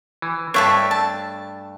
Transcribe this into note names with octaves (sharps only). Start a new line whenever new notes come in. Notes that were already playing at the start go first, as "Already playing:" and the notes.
E3
G2 A3 D4 C#5 E5 A5
A5